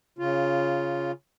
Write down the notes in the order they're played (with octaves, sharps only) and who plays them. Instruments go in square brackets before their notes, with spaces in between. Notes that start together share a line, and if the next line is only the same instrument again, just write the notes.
[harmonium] C#3 F4